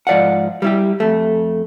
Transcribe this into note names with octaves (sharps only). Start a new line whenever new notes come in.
G#2 F3 D5 F5 F#5
G3 E4 G4
F2 A3